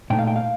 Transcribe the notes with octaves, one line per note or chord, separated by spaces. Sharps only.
A#2 A3 D#4 G5
F5
G5
F5